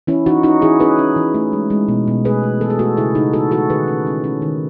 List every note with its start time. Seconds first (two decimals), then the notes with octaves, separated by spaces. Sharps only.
0.07 E3 C#4 E4
0.26 E3 D#4 F#4
0.43 C#4 D#4 F#4
0.61 E3 E4 G#4
0.80 C#4 G#4 B4
0.99 C#4
1.16 E3
1.34 A3
1.53 G#3
1.70 G#3
1.88 B2
2.08 B2
2.25 A3 G#4 B4
2.43 A3
2.61 E3 A4
2.70 G#4
2.79 A3 F#4 A4
2.97 C#3 E4 G#4
3.15 C#3 D#4 F#4
3.33 E3 F#4 A4
3.51 E3 F#4 A4
3.70 D#3 G#4 B4
3.88 C#4
4.07 C#4
4.24 C#4
4.42 D#3